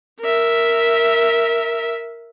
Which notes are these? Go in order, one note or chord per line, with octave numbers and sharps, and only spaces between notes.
A#4 E5